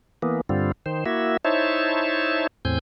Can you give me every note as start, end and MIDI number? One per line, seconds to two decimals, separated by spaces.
0.22 0.41 52
0.22 0.41 58
0.22 0.41 59
0.49 0.72 43
0.49 0.72 50
0.49 0.72 55
0.49 0.72 60
0.49 0.72 65
0.86 1.04 51
0.86 1.04 72
1.06 1.37 58
1.06 1.37 64
1.06 1.37 66
1.06 1.37 76
1.45 2.47 63
1.45 2.47 64
1.45 2.47 72
1.45 2.47 73
1.45 2.47 76
1.45 2.47 81
2.65 2.79 40
2.65 2.79 45
2.65 2.79 60
2.65 2.79 80
2.65 2.79 91